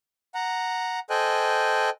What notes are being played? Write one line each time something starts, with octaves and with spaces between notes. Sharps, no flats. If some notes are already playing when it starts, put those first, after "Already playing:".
F#5 A#5
A4 C5 D#5 G5 G#5 F#6